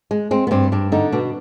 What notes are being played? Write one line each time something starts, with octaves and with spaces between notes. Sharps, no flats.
G#3
G#3 C4
B3
G2 C4
G2 D4
D3 D#4
B2 D4